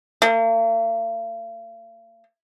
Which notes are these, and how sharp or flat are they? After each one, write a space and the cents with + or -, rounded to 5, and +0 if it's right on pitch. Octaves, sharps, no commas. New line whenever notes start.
A#3 -45